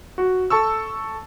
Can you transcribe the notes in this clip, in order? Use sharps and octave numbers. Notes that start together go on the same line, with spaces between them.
F#4
A4 A5 C#6 E6